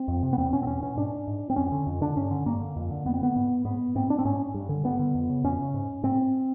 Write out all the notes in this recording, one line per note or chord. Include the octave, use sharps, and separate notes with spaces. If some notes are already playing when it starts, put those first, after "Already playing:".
Already playing: C4
F2
C3
B3
E2 C4
B2 C#4
C4
E2 C#4
B2 C#4
G#2 D4
G#2
C4
F2 C#4
D3
F2
D3 D4
G2 C#4
D3
G2 A#3
D3
F2
D3
F2 B3
C4
D3 B3
G#2
G#2 B3
G#2 C4
D4
C4
G#2 C#4
G2
D3
G2 B3
D3
F2
C#3
F2 C#4
C#3
G#2
G#2 C4